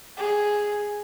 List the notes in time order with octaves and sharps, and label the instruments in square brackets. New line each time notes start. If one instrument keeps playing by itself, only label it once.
[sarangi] G#4